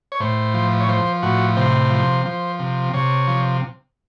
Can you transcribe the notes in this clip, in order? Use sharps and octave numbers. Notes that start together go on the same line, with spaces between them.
C#5
A2 C5
F3
C#5
F3 C5
A2 F#4
C3 C5
F3
F3
C3
C3 C#5
F3